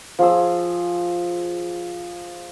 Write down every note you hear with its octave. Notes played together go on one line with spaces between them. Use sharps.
F3 G#4 E6